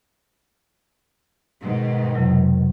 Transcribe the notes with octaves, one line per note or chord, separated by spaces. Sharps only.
G#2 B2 D#3
F2 C3 F#3